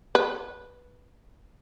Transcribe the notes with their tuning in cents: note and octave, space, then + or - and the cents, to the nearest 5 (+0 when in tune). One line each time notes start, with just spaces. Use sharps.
B4 -10